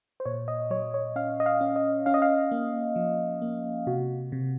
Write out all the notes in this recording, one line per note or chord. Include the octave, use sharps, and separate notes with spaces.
C5
A#2 C#5
D#5
F#3 C#5
C#5
C#4 F5
D#5
F5
C#4
D#5
C#4 F5
D#5
F5
A#3
F3
A#3
C3 F#4
C3